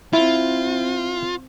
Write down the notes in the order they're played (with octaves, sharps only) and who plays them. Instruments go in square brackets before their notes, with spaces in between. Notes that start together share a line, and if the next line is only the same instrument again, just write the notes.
[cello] C4 [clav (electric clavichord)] E4 [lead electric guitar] F4